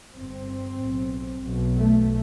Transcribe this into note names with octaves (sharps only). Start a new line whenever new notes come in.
G1 G2 C4
B1 A2
B1 B2
A3